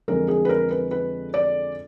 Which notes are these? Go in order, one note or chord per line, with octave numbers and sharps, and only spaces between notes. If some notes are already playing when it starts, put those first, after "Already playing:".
F2 D3 G#3 A#4
G#4
B4
A#4
B4
B4
D5